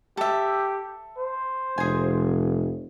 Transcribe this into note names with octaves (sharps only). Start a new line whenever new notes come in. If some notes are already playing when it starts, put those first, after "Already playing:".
G4 A4 E5
C5
F1 G#4 G#5